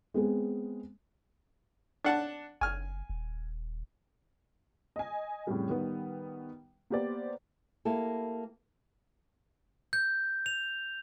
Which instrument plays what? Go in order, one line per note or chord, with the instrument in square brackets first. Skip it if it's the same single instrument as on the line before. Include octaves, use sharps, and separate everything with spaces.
[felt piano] G#3 B3 C4 G#4
[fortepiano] D4 F#5 A5
[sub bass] F#1 [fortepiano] G#5 F6
[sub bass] D#1
[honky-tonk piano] D#5 G#5
F2 A2 C#3 G3
D#3 G3 B3
A#3 B3 G4 C5 D5
[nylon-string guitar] A#3 E4 G4 A4
[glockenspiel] G6
F7